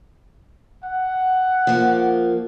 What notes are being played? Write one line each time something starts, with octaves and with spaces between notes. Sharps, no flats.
F#5
F3 A#3